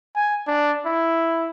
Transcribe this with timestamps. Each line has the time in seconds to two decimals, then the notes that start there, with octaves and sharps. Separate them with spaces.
0.16 G#5
0.47 D4
0.86 E4